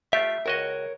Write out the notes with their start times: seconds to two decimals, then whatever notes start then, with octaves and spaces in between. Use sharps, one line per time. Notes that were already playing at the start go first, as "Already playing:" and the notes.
0.13 A3 F4 G4 E5
0.46 C#2 F#4 A#4 C#5 D#5